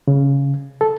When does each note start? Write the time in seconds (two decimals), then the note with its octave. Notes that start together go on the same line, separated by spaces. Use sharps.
0.08 C#3
0.81 A4